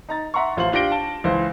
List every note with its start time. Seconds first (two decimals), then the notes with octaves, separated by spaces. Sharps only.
0.09 D#4 A#5 A6
0.34 E5 F#5 A#5 C6 C#6
0.57 A1 F4 C5 F#7
0.72 D4 F4 G4 A#6 D7 G7
0.92 A5
1.24 C#2 E3 C5